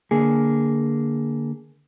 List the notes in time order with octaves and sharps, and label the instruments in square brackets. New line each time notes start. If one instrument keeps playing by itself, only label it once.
[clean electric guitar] D3 A#3 G#4